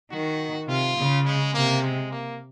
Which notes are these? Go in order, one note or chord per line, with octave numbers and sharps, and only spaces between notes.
D#3 F#4
C3 F4
C#3
G#3
C3 A#3
G#3
A#3